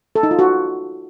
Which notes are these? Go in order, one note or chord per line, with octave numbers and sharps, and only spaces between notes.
A4
D#4
F4
F#4